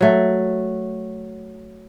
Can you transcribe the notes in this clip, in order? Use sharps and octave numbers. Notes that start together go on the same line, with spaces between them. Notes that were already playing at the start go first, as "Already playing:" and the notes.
F#3 A3